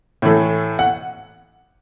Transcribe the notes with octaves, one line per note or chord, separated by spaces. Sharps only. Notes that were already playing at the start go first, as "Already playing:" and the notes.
A2 E3 A3
F#5